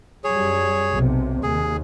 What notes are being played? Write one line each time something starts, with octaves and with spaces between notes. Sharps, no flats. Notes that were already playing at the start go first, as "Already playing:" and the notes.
F#2 G3 G#4 C#5
B1 C3
D#2 G#4